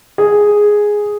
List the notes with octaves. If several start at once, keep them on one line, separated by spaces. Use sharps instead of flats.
G#4